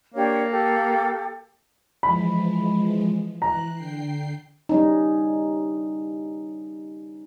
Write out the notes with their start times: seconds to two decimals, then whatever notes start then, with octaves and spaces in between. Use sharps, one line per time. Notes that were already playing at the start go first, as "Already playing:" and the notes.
0.14 A#3 D4 G4 C#5
0.51 G4 A4
2.03 E3 F3 G#3 B5
3.42 E3 A#5 F#6
3.73 D3 G5 C7
4.69 G3 C#4 D#4